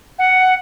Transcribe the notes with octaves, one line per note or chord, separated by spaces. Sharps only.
F#5